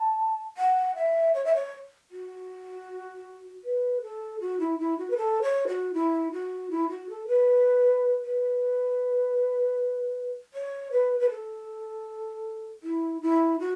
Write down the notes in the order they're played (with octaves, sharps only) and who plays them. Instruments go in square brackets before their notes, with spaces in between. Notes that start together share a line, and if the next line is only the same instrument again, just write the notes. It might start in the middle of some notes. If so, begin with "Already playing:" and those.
Already playing: [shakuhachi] A5
F#5
E5
C#5
E5
C#5
F#4
B4
A4
F#4
E4
E4
F#4
B4
A4
C#5
F#4
E4
F#4
E4
F#4
A4
B4
B4
C#5
B4
B4
A4
E4
E4
F#4